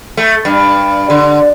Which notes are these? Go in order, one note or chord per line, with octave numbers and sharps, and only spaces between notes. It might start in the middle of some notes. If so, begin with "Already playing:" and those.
A3
G2
D3